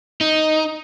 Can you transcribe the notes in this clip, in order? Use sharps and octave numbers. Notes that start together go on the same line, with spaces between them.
D#4